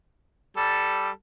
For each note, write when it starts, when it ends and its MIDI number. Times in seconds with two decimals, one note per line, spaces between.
0.57 1.09 55
0.57 1.09 69